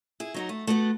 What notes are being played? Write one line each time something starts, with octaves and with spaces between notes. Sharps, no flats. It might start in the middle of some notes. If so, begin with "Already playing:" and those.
E4 G#4
F#3 D#4 F#4
A3
A3 B3 F#4 G4 A4